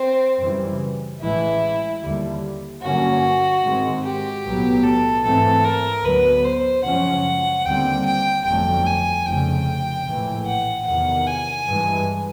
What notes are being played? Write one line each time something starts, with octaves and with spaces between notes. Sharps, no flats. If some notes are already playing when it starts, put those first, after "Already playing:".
Already playing: C4
F#2 C#3 E3 G3
A1 A2 E3 G#3 E4
D#2 D3 G3
G2 D3 F#3 A#3 C#4 F#4
G#2 D#3 G#3 C4
G4
B1 A2 F#3 B3
A4
G#2 E3 A3 C4 A4
A#4
D2 D3 F#3 B3 B4
C5
F#2 C#3 F3 G#3 C#4 F#5
D#2 D3 G3 C4 G5
G5
G1 F2 D3 F#3 A3 G5
G#5
F1 F2 C#3 G5
A#1 A2 E3
F#5
E2 C3 D#3 F#5
G#5
G2 E3 G#3